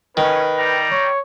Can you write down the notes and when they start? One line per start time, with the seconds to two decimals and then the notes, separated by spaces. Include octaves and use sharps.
0.17 D#3 C#4 B4
0.57 G3 G5 A#5
0.91 C#5